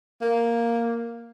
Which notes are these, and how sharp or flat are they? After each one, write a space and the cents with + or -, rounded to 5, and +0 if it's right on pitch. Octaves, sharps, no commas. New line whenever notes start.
A#3 +0